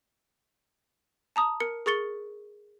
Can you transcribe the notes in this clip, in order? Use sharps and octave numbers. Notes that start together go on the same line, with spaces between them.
A5 A#5 D#6
A#4 C#7
G#4 A#4 C#6 A6 C#7 G7